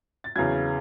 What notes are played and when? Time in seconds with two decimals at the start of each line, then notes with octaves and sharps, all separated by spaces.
0.24 A6
0.35 E2 C#3 F#3 G#6